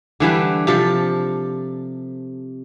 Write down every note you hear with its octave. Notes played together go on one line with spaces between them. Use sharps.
D3 E3 G3 D4
C3 F3 A4